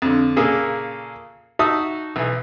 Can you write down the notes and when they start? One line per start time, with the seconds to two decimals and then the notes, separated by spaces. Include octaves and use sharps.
0.02 F2 D3
0.36 A#2 C#3 A#3 G#4 A4
1.59 D#4 F#4 E5 A5 D#6
2.16 B1 E3